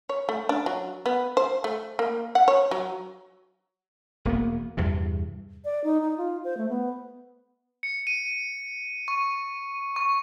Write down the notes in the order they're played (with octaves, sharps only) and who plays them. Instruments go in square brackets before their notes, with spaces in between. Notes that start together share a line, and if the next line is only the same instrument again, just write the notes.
[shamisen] C#5
A3
D4
F#3
B3
C5
A3
A#3
F#5
C#5
F#3
[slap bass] E1 A#3 B3
E2 G2 C3
[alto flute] D5
D#4
D#4
F4
C5
A3
B3
[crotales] C#7
D#7
C#6
C#6